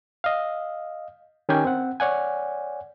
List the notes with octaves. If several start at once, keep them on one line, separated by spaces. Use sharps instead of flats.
D#5 F5
D#3 C#4 G4 A#4 G5 G#5
C4 F#5
C#5 D5 F#5 G#5